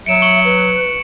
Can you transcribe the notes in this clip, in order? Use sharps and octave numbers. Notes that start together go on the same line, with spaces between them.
F#3 E5 C#7 D7 E7
C#6 C#7 F#7
B4